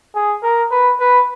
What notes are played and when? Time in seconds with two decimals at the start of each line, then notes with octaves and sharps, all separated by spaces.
0.15 G#4
0.43 A#4
0.71 B4
1.00 B4